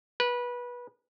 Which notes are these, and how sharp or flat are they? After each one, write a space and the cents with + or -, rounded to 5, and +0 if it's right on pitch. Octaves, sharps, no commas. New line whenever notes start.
B4 -20